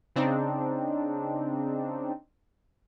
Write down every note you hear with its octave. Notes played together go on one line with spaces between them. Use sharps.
C#3 C4 D4 D#4